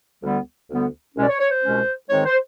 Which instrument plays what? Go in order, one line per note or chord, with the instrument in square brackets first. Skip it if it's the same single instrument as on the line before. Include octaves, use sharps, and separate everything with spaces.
[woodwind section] D2 D3 G3 B3
D2 D3 G3 B3
C2 B2 G#3 C#4
D5
C#5
C#5
C5
C2 B2 G#3 C#4
G#2 D#3 G#3 C4 D#4 C#5
C5